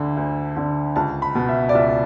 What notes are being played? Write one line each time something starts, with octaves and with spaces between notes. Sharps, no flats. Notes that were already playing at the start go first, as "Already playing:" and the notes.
Already playing: D2 D3
D2
D3
C#2 A5
B5
B2
E5
D5
C#2 E5